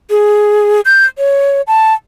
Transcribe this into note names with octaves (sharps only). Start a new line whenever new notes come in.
G#4
G6
C#5
A5